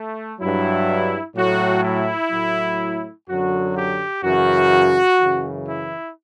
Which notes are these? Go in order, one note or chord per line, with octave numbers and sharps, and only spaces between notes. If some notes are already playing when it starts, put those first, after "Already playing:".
Already playing: A3
G2 F#3 E4
A2 F#3 F#4
E4
A2 F#3
F#2 D3 F#3 F#4
G4
F#2 C#3 E3 F#4
F#2 C#3 E3
E4